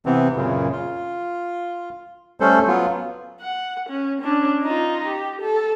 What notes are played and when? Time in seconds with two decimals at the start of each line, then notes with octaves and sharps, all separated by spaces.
0.06 C3 E3 B3 C4
0.36 F#2 A#2 C#3
0.72 F4
2.40 G3 A3 C#4 A4 C5
2.67 F#3 B3 F4
3.41 F#5
3.90 C#4
4.22 C#4 D4
4.63 D#4 F4
5.08 G4
5.41 A4